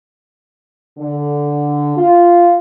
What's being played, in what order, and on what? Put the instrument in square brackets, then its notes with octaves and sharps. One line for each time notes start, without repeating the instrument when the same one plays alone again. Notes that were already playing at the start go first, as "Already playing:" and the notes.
[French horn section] D3
F4